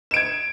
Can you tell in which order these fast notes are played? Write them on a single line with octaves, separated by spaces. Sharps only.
E7 D7 G#6